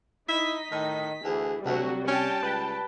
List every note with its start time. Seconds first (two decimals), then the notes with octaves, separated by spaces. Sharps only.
0.28 D#4 E4 D#5 B6
0.72 A2 D#3
1.24 D2 E3 G#4
1.65 D2 C3 F#3 G3 F#4
2.08 C#4 G5 A5
2.43 C#2 B4